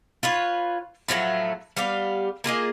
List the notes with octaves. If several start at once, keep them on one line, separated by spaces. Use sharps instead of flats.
F4 B4 C#5
A2 F3 F#3 A3
G3 B3 G4 F5
A#3 F4 G#4 D#5